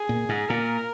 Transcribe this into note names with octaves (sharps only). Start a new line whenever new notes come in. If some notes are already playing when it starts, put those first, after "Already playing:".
Already playing: G#4
A#2
G#2
A#2 A#4